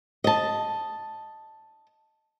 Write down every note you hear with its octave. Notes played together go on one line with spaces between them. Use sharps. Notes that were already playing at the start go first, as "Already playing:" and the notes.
D#5 A5